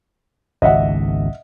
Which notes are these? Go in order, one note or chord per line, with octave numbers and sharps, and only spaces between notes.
G#1 C#2 D#5 E5 F#5